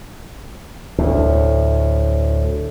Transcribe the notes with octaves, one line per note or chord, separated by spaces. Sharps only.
D2 A2